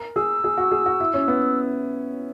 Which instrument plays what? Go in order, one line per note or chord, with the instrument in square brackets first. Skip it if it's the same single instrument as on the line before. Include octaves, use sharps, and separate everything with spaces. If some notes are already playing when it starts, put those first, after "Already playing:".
Already playing: [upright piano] A#4
[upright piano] G#4 [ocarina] E6
[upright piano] G#4
F#4
G#4
F#4
E4
C#4
B3